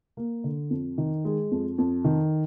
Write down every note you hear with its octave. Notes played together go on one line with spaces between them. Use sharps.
A#3
D3
F2
D#3
G#3
F2
F2
D#3